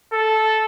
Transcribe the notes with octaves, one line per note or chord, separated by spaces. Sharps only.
A4